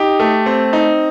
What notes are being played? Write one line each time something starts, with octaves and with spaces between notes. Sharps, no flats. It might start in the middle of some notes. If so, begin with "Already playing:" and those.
Already playing: D#4 G4
A3
C4
D#4